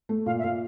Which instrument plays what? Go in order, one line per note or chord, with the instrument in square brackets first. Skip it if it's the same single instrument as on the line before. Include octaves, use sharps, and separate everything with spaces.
[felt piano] A3
[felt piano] A#2 [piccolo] F5
[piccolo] E5
[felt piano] A#2 [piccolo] F5